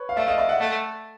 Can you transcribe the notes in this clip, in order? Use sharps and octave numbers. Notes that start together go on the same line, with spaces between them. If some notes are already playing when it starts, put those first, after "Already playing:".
Already playing: B4 C#5
F5
A3 D5 E5
D#5 F5
D5 E5
E5 F#5
A3